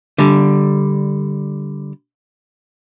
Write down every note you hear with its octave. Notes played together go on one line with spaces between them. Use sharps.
D3 G3